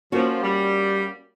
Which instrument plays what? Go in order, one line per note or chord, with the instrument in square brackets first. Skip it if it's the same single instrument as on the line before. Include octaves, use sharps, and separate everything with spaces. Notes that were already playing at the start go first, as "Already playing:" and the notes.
[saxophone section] F3 [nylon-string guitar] A#3 C#4 F#4
[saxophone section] G3